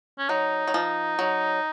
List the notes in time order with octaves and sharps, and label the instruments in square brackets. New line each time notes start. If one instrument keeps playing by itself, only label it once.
[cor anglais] C#4
[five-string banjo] F#3 [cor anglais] D#4
[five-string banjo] F#3
F3
F#3